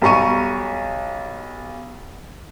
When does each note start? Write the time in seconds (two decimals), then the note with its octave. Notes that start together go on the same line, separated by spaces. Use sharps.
0.02 B1 G3 A#5 C#6 D#7